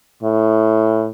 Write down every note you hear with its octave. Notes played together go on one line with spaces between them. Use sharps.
A2